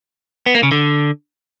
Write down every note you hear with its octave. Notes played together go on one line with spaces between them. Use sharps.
B3
A#3
C#3
D3